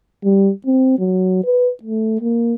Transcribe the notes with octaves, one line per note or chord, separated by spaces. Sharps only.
G3
C4
F#3
B4
A3
A#3